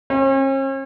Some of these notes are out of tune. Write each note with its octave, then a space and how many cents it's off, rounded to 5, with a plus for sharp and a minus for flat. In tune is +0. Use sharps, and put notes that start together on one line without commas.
C#4 -45